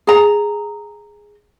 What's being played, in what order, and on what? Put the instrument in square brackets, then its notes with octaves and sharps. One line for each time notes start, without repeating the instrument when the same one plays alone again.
[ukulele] G#4 A#5